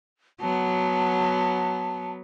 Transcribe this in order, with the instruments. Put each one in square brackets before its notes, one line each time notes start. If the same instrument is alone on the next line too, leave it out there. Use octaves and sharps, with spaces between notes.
[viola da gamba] F#3 B3 [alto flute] A5